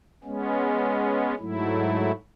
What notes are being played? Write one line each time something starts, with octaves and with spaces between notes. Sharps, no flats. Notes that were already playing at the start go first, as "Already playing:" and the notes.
G#3 B3 C#4
G#2 F#3 A3 E4